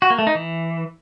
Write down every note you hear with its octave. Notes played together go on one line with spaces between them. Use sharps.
F#4
A#3
A3
D#4
E3